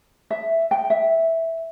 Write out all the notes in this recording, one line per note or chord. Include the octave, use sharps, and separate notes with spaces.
E5
G5
E5